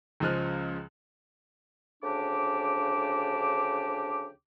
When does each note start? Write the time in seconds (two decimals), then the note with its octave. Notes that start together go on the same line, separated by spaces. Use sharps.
0.20 C#2 C#3 F3 G#3 F6 F#6
2.03 D2 C#3 F3 D4 G4 D6